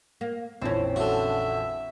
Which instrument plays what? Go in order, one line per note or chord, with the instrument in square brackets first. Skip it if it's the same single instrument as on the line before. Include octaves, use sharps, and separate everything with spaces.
[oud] A#3
[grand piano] A#1 F2 E3 [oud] C4 C#4
[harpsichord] D3 F#4 [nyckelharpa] E5